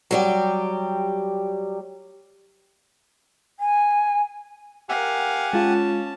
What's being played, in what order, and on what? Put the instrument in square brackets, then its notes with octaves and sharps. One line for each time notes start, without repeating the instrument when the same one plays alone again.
[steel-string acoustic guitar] F#3 G3 G4
[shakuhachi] G#5
[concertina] G4 F#5 G#5 [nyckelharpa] A#4 F5
[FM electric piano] G#3 F4 [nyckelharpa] C#4 A5